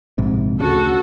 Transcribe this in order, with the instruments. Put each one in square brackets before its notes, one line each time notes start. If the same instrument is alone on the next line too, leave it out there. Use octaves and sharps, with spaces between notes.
[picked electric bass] A#1 G#2 C3
[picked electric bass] D2 C#3 [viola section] F#4 A4